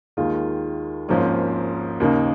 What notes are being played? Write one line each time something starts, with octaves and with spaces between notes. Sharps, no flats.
D#2 D#3 G#3 F4
G#1 G#2 F3 A#3 C#4
D#2 C#3 A#3 D#4